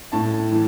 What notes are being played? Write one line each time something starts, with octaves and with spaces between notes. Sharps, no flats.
A2 A5
E3